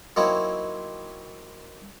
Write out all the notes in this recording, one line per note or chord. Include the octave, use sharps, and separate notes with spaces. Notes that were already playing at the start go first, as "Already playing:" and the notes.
F#3 A#3 C4 D#4 E4 C#5